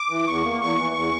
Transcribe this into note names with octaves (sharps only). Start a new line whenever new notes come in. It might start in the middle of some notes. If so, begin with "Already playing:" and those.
Already playing: D6
E3
E2 C#6
A#3
E2 C#6
E3
E2